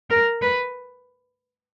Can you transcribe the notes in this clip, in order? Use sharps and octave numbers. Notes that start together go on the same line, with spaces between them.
A#4
B4